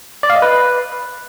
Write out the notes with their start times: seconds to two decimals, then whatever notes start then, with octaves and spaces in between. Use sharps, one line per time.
0.23 D5
0.30 F5
0.36 D#5
0.42 B4